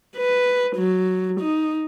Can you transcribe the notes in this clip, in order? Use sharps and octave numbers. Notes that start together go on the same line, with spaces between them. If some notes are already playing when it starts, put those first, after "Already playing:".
B4
F#3
D#4